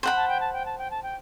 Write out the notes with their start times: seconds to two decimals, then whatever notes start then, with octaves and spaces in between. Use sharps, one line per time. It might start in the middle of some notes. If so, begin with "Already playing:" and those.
0.03 C5 F#5 G5 B5
0.16 A5
0.28 G5
0.40 A5
0.53 G5
0.65 A5
0.78 G5
0.90 A5
1.03 G5